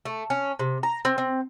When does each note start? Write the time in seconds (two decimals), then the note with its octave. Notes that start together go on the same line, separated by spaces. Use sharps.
0.05 A3
0.30 C#4
0.59 C3
0.83 A#5
1.05 C4
1.18 C4